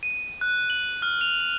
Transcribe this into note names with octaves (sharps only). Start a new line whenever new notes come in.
D#7
F#6
F#7
F6
F7